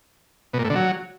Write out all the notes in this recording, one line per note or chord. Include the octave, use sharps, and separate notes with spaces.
B2
A#2
A2
D3
F#3